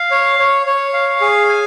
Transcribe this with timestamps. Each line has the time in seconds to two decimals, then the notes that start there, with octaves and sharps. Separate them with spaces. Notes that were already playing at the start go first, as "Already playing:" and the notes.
Already playing: F5
0.11 C#5
0.39 C#5
0.66 C#5
0.94 F5
1.21 G#4
1.49 G#5